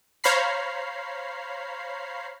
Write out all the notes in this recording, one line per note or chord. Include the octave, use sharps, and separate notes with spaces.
C5 C#5 F5 A#5 B5 C7